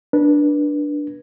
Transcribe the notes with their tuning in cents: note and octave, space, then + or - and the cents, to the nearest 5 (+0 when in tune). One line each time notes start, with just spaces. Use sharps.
D4 +0 B4 -30